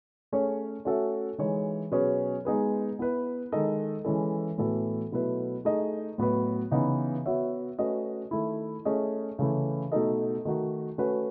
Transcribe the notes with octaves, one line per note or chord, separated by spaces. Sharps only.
A3 C#4 G#4 C#5
A3 C#4 F#4 A4 E5
E3 G#3 D#4 G#4 C#5
B2 F#3 C#4 G#4 B4
G#3 B3 D#4 G#4 B4
B3 E4 B4
D#3 G#3 D#4 A4 D#5
E3 G#3 C#4 E4 A4
A2 E3 B3 F#4 A4
B2 F#3 A3 E4 B4
A3 D#4 G#4 D#5
A2 F#3 B3 F#4 B4
C#3 E3 B3 D#4
B3 F#4 C#5 E5
A3 C#4 F#4 B4 D#5
D#3 A3 E4
A3 C#4 G#4 D#5
C#3 E3 A3 E4
B2 A3 D#4 A4 D#5
D#3 A3 D#4 F#4
A3 C#4 F#4 B4